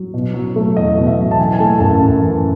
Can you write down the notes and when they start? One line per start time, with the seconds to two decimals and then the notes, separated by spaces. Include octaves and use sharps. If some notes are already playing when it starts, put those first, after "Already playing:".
Already playing: F#3
0.14 B2
0.34 F#3
0.56 A3
0.76 E2 D#5
0.97 B2
1.07 E5
1.18 F#3
1.31 A5
1.38 E3 G#5
1.53 G#5
1.59 A3 A5
1.80 F#2 A5
2.01 F#2
2.21 E3